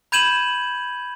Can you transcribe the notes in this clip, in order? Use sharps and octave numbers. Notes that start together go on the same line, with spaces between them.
B5 G6 G#6 D#7 E7 F#7